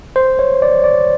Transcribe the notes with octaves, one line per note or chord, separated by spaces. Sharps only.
C5
C#5
D5
D5